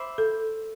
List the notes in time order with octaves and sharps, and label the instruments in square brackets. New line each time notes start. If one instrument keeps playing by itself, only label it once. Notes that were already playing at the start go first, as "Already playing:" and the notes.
Already playing: [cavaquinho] C5 E5 B5 D6
[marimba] A4